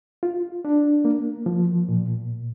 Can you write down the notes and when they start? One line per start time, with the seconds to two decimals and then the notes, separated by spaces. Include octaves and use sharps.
0.23 F4
0.65 D4
1.05 A#3
1.46 F3
1.89 A#2